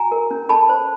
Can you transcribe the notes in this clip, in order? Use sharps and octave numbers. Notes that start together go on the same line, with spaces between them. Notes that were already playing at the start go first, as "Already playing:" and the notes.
Already playing: F#4 G#5 A#5
A#4
C#4
A4 A5 B5
C5